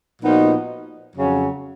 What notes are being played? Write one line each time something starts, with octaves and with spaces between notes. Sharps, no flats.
A#2 F3 B3 D#4 F#4
F2 C#3 F#3 C#4